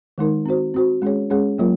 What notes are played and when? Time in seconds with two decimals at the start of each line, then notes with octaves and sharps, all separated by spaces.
0.18 D#3 G#3 D#4 A#4
0.46 C4 F#4 C5
0.74 C4 F#4 C5
1.02 G#3 C#4 G#4 C#5
1.30 G#3 C#4 G#4 C#5
1.58 F#3 A#3 F4 A#4 C#5